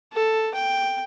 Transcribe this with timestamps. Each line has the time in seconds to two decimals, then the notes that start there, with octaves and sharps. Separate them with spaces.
0.13 A4
0.55 G5